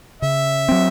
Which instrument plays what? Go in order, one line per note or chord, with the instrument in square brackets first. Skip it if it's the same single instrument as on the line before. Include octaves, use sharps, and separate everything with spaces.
[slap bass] C#3 [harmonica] E5
[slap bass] F#3 C4